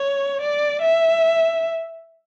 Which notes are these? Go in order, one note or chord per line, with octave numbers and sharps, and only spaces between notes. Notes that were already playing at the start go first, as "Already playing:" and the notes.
Already playing: C#5
D5
E5